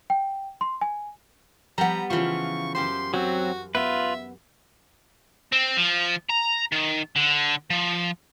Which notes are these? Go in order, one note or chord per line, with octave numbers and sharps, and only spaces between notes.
G5
C6
G#5
F3 G3 B3 F#5 A#5
C#3 E3 F3 F4 C#6
F#2 G4 C5 C6
F#3 C4 F#4
B3 F4 B4 E5
C4
F3
A#5
D#3
D3
F3